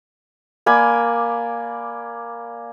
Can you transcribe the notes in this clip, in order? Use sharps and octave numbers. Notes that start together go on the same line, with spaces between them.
A#3 D5 G#5 B5